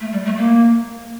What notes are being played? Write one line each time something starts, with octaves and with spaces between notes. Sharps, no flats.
A3
G3
A3
A#3